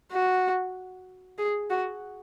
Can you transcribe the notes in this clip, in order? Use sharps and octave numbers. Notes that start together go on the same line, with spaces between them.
F#4
G#4
F#4